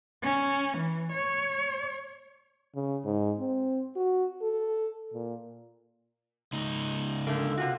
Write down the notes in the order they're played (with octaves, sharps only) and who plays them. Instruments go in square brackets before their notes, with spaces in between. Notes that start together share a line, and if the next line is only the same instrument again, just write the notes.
[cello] C#4
E3
C#5
[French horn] C#3
G#2
C4
F#4
A4
A#2
[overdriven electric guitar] C#2 D#4
[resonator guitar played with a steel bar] D3 A3 A#3
C3 F4 F#4